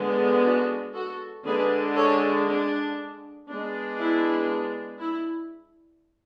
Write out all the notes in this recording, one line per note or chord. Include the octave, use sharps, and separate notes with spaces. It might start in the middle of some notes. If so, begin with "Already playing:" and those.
Already playing: D3 G#3 B3
D4 F#4
F#4 A4
D3 G#3 D4 G#4 B4
A4 C#5
D4
G#3 B3 D4
E4
E4